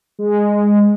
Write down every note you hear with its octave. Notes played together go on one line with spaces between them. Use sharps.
G#3